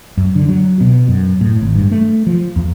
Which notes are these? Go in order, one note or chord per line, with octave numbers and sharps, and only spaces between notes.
F#2
D3
F#3
B2
F#2
A2
G#1
G2
A3
F3
E2